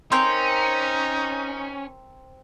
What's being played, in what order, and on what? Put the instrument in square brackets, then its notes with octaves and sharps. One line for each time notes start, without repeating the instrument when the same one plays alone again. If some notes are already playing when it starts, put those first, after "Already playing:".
[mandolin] C4 A#4 G6 [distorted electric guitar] C#4 [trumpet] D#4 [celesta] C6